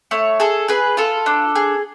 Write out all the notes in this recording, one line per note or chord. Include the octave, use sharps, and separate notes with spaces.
A3 C#5
G#4 A4
G#4 B4
F4 A4
D4
G#4